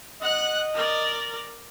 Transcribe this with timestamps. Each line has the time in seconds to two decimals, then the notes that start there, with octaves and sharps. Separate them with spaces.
0.21 D#5 F#5 F#6
0.74 A#4 D5